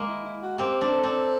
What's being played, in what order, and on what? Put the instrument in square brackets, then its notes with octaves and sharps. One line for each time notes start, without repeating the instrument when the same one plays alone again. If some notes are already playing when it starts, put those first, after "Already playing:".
Already playing: [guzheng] G#3 A#3
[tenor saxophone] E4
E4
F#4
[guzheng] A#3 C4 [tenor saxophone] G4
[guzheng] C4 D4
[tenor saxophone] A4
[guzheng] C4 D4